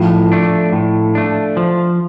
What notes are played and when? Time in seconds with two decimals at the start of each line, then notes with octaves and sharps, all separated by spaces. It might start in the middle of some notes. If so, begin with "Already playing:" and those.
Already playing: A2 F3
0.31 A3 D4
0.72 A2
1.15 A3 D4
1.57 F3